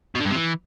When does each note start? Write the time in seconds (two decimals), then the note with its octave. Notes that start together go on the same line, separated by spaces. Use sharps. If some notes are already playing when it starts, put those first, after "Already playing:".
0.15 B2
0.20 D3
0.26 G2
0.31 C3
0.36 E3